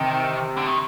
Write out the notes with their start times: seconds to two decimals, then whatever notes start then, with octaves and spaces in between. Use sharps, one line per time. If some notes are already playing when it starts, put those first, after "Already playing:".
Already playing: C3 D#3
0.57 D3
0.67 D#3